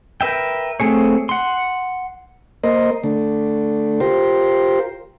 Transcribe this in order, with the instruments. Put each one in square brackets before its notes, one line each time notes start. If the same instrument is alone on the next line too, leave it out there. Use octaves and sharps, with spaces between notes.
[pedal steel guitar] A#4 B4 E5 G5
A3 C4 G#4 C#5
F#5 C6
[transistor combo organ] A#3 A#4 C5 D#5
D3 A3
F4 G4 A#4 C5